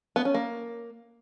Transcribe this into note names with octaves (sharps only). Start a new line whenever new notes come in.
B3
C#4
A#3